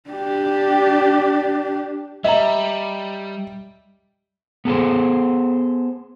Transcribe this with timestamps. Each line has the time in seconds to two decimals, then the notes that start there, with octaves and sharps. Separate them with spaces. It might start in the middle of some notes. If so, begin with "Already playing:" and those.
0.10 D4 G4
2.24 G3 D#5 E5 A#5
4.65 B3 G#4 A4 C5